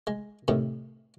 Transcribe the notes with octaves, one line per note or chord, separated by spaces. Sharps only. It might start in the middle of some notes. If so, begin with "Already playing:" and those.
G#3
A2 C3 D#3